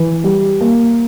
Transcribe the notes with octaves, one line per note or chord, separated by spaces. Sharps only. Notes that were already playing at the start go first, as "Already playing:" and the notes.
Already playing: E3
G3
A#3